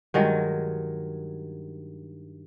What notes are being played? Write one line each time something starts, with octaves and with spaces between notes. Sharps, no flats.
G2 D#3 F#3 G#3